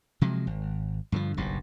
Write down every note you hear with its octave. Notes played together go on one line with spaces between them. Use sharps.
C3 F3 F#3 G#3
G#1
G2 D3 D#3 F3
F#1 B1 G2